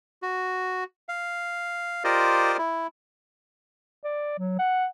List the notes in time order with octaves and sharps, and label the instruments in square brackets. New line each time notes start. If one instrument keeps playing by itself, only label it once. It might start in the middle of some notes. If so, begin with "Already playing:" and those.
[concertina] F#4
F5
F4 G4 A#4 C5 D5 D#5
E4
[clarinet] D5
F#3
F#5